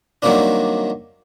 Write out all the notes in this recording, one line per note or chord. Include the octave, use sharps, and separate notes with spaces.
D#3 F#3 G3 A#3 C4 D4